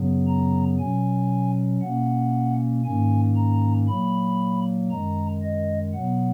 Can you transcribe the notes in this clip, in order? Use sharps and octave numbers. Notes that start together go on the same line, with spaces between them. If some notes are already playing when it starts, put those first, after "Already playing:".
Already playing: F#2 C#3 F#3 B3
A#5
B2 F#3 C#4 G#5
B2 A#3 C#4 F#5
G#2 D#3 A#3 C#4 G#5
A#5
A#2 F#3 A#3 B5
F#2 D#3 G#3 A#5
D#5
B2 F#3 B3 F#5